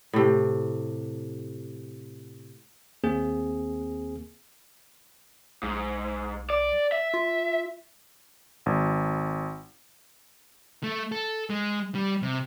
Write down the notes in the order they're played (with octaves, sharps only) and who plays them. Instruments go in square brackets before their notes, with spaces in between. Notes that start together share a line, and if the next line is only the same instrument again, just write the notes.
[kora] A2 C3
[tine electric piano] D#2 A#3 C4 G#4
[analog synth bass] B1 [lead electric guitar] G#2
[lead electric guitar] D5
E5
[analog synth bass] F4
[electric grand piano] G#1
[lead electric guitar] A3
A4
G#3
G3
C3